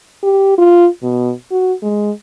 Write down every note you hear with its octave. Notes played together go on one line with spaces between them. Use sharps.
G4
F4
B2
F#4
G#3